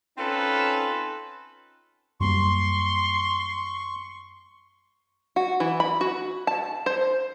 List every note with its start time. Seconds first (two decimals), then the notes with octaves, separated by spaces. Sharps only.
0.17 C4 C#4 D#4 F4 A4 B4
2.20 F#2 G3 A#3 C6 C#6
5.36 F#4
5.60 E3
5.80 B5
6.01 F#4
6.47 A5
6.86 C5